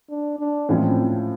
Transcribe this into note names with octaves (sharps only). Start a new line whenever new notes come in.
D4
D4
A2 F3 G#3 C4 C#4 F4